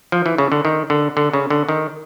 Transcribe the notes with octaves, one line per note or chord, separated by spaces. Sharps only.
F3
E3
C#3
D3
D#3
D3
D3
C#3
D3
D#3